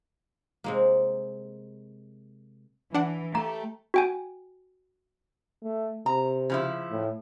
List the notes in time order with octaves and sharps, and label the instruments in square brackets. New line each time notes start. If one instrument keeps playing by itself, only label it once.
[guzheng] C3 G#3 A#3
[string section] E3 [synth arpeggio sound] D4 F#5
[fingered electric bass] A3 [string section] G4 A4 [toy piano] A#5
[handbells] F#4 G5 G#5
[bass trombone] A3
[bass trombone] C3 [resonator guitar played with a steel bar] A#5
[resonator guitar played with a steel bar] C#3 F3 E4
[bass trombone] A2